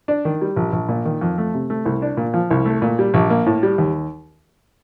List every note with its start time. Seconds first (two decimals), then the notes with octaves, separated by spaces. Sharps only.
0.08 D4
0.25 D#3
0.42 G3
0.56 A#1
0.73 A#1
0.89 A#2
1.05 D#3
1.21 F2
1.38 A3
1.54 C3
1.70 A3
1.86 C2
2.02 D4
2.17 A#2
2.34 F3
2.51 C2
2.65 A3
2.82 A#2
2.99 G3
3.14 A#1
3.30 A#3
3.46 A2
3.63 G3
3.78 D#2